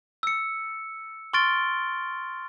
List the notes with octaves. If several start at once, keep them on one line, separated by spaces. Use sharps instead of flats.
E6 C#7
C6 C#6 F6 A6 D7 G7